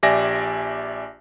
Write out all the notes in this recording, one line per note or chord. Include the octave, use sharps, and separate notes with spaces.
A#1 G4 D5 E5 G#5 A#6